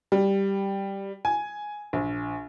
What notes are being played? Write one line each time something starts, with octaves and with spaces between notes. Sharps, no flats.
G3
G#5
A#1